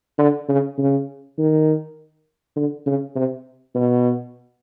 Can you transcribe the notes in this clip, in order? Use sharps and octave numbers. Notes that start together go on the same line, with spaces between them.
D3
C#3
C#3
D#3
D3
C#3
C3
B2